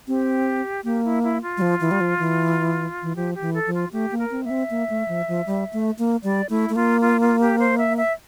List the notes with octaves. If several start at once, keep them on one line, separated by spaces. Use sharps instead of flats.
C4 G4
A#3 G4
E4
E4
F4
G3
F3
E3
G3
F3
E3
E3
F3 G4
G4
E3
A4
F3
F4
A3 G4
A#3
A#4
C4
A#3 E5
C4
A#3
A3
F3
F3
G3
A3
A#3
G3 D5
A3 E4
A3
A#3 F4
F4
F4
G4
C5
E5
E5